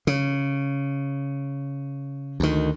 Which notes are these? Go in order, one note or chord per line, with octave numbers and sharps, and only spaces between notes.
C#3
D2 D#3